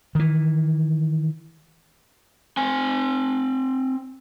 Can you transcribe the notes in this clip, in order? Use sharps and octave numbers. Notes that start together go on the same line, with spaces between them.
D#3 E3
C4 G#5